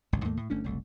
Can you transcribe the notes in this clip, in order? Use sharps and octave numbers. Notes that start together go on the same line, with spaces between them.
G#1 C#2 A2
D#2 G#2 A3 A#3
A2
G1 A3 C#4 D4
F#1 C2 A3